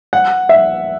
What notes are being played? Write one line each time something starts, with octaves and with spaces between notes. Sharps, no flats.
F#5
E5